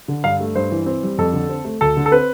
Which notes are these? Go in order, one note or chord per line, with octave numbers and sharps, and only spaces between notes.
D3
G2 F5
A3
G2 C5
E3
C4
G3
F2 A4
D3
C4
A3
D2 A4
D3
A4
C4 B4